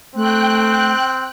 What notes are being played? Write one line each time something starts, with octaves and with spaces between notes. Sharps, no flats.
A3 C4 G5 F#6